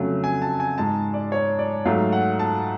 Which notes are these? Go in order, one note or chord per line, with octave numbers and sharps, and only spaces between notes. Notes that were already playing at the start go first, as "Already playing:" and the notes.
Already playing: F2 C#3 F#3 A3
G#5
A5
G#5
G#2 G#3 A5
D5
C#5
D5
G#2 F#3 A3 F5
F#5
A5